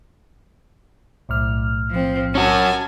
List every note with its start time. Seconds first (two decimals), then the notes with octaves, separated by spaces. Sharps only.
1.29 B1 A2 F6
1.91 F3 C4
2.35 C#4 F#4 G#5 A5